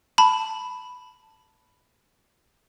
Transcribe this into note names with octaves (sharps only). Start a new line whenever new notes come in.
A5 B5